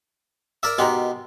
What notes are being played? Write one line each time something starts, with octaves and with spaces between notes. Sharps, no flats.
A#4 D5 E5
B2 D#3 G#3 G4